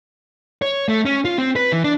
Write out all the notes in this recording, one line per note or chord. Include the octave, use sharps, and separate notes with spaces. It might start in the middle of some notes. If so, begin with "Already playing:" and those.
C#5
A3
C#4
F4
C4
B4
E3
D4